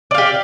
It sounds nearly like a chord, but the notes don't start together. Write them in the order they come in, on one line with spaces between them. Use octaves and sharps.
D5 F5 G4